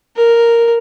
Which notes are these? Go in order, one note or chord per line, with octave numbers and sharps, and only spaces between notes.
A#4